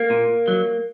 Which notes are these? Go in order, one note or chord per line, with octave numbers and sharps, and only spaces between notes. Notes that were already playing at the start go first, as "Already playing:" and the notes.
Already playing: A#3
A#2
F#3